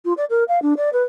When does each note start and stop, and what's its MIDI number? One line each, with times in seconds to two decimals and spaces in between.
0.05 0.13 65
0.17 0.25 74
0.30 0.44 70
0.48 0.62 77
0.62 0.74 62
0.77 0.89 74
0.93 1.03 71